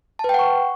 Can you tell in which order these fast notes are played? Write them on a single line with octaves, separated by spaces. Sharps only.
A5 B4 G5 F#5 C#6